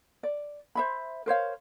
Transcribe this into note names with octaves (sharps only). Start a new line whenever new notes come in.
D5
C5 E5 B5
A#4 C5 C#5 F5